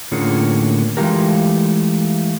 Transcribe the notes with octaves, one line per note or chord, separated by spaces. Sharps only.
A2 D3 A#3 C#4 F4 G#4
E3 G#3 A3 F4 G4 A#4